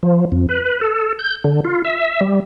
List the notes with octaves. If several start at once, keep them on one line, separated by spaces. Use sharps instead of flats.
F3
F2
B4
A4
G6
D3
F4
E5
G3